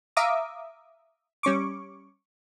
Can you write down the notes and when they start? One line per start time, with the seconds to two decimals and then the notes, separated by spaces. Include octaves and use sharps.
0.17 E5 F5 A#5 D6 D#6
1.43 G3 C#4 C#6 D6